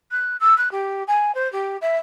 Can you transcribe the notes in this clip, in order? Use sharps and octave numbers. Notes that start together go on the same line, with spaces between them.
F#6
E6
F#6
G4
G#5
C5
G4
E5